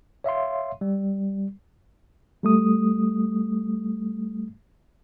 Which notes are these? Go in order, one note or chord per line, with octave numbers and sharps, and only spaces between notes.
C#5 E5 F5 C6
G3
G3 A3 D#6